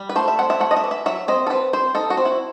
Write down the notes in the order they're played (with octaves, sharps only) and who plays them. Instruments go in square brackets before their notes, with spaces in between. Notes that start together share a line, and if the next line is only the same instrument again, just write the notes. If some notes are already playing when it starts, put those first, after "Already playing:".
Already playing: [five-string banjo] G3
B4
A3 C5
E5
C4 F#5
E5
A3 F#5
D#5
E5
E3
E5
F#3 E5
C4 D#5
A4
C4 B4
C4 C5
D#4 A4
F#4
C4
E4